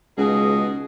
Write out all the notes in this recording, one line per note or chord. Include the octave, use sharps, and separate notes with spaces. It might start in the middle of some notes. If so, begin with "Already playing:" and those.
C#2 B2 D#4 G#4